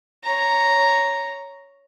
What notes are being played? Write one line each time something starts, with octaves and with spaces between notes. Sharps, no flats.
C#5 A#5